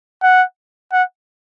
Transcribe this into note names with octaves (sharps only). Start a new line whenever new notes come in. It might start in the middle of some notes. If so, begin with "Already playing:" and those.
F#5
F#5